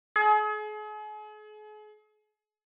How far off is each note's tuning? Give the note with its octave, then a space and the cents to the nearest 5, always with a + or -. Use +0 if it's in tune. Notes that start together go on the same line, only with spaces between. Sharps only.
G#4 +40